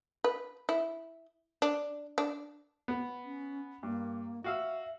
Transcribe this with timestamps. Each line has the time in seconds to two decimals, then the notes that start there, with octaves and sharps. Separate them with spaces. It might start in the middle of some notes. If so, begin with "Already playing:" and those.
0.24 B4
0.69 E4
1.62 D4
2.18 D4
2.88 B3
3.24 C#4
3.83 G2 A#3
4.44 F#4 E5 F5 E6